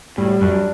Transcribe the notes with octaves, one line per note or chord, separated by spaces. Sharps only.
A2 G3
F#2 D4